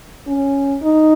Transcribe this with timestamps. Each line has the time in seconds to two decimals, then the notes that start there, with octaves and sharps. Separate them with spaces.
0.28 C#4
0.83 D#4